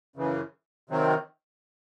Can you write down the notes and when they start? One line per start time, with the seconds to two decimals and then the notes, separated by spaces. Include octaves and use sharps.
0.16 F#2 C#3 E3
0.89 C3 D#3 F#3 C4